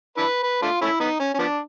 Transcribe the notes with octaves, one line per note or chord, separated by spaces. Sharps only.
D4 E4 B4
B4
A3 D4 F4
A3 C#4 E4
B3 D#4
C#4
C#4
F3 B3 D4